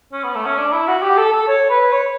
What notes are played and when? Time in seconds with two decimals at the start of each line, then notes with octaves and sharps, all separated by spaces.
0.13 C#4
0.24 B3
0.35 A3
0.46 C#4
0.58 D4
0.73 E4
0.88 F#4
1.02 G4
1.17 A4
1.32 A4
1.48 C#5
1.70 B4
1.93 C#5